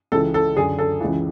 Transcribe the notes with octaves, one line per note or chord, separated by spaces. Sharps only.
C#2 C#3 E3 A4
A4
F#2 D3 G#4
A4
C#2 C#3 E3